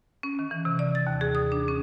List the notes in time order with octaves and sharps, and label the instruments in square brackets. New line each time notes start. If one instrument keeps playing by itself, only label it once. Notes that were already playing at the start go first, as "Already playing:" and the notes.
[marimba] C#4
D#3
E3
C3
D5
A6
D#2
G#4
D#6
D4
C#4